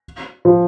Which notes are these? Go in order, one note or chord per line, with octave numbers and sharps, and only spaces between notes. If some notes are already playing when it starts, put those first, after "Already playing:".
F3